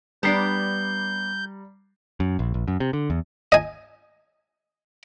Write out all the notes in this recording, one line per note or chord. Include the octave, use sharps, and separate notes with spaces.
G3 B3 D4 D5 A#5 G6 C7
F#2
A#1
A#1
F#2
C3
D3
E2
D#5 G#5